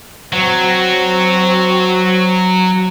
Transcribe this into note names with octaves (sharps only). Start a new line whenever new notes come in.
F#3 C4 F#4